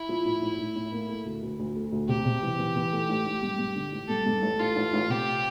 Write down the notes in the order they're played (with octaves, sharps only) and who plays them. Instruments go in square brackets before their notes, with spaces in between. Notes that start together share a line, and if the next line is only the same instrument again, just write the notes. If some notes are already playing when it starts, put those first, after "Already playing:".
Already playing: [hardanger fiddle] E4
[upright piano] F3
A2
A2
A2
A2
A#3
A3
D2
D2
D2
A3
D2
[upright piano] C3 [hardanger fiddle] G4
[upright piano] C3
E3
E3
E3
A3
A1
A1
G2
G2
D3
A1
[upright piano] G2 [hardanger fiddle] A4
[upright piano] G2
A1
[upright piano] A1 [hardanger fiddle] F4
[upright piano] A1
A1
[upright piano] C3 [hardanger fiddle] G4